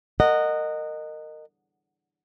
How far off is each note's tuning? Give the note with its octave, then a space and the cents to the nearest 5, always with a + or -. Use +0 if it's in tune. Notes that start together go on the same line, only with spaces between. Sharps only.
A#4 -25 D#5 -15 F#5 +0